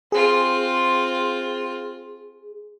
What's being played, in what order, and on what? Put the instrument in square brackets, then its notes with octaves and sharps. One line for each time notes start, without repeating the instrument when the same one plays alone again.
[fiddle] C4 F4 [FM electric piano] G#4